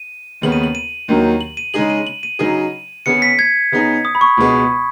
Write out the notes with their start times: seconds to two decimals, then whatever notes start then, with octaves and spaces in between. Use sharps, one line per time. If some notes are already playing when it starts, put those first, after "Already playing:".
Already playing: D#7
0.42 D#2 C#3 B3 F#7
0.52 D#7
0.63 F#7
0.75 D#7
1.08 D#2 D#3 F#3
1.41 F#7
1.57 D#7
1.74 C#3 G#3 D#4 G#4 F#7
1.90 D#7
2.07 F#7
2.23 D#7
2.39 C#3 F#3 D#4 G#4
3.06 C#3 B3 G#4 C#7
3.22 B6
3.39 G#6
3.72 C#3 B3 D#4 G#4
4.05 D#6
4.15 B5
4.21 C#6
4.37 C#2 B2 G#3 B3 G#4